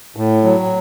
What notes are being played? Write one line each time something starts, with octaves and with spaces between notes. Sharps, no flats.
A2
F#3